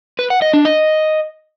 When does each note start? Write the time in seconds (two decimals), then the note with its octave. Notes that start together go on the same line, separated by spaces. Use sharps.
0.19 B4
0.30 F#5
0.42 D#5
0.53 D4
0.65 D#5